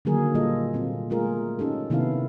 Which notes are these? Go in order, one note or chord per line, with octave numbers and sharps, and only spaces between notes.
D3 D#3 F#3 A#3 G#4 A#4
A#2 G3 A#3 F4 A4 D#5
A#2 C4 F4
G#3 A3 F4 G#4 A#4
C#4 D#4 G4 A4
C3 D#3 B3 E4 A4 F5